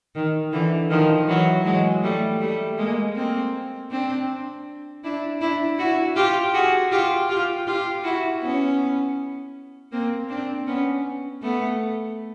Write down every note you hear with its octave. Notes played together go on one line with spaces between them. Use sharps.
D#3
D3 E3
D#3 F3
E3 F#3
F#3 G#3
G3 A3
G3 A3
G#3 A#3
A#3 C4
C4 D4
D4 E4
D4 E4
E4 F#4
F4 G4
F#4 G#4
F4 G4
F4 G4
F4 G4
E4 F#4
B3 C#4
A#3 C4
C4 D4
B3 C#4
A3 B3